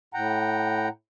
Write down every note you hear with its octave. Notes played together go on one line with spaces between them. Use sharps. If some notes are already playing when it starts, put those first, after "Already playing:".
A2 F#5 G5 A#5